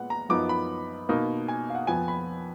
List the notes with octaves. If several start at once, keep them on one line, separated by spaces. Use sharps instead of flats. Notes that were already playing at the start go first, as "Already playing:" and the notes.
Already playing: A#2 G#3 B3 F#5
A#5
F#2 F3 B3 D#4 D6
B5
B2 A#3 D#4
G#5
F5
F#5
F2 F3 B3 G#5
B5